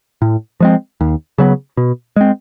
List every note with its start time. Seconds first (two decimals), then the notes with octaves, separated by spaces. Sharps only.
0.22 A2
0.60 F3 G#3 C4
1.01 D#2
1.38 C#3 F#3 B3
1.77 B2
2.16 G#3 C4